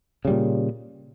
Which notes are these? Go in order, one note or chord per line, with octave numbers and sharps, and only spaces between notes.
A#2 C#3 G3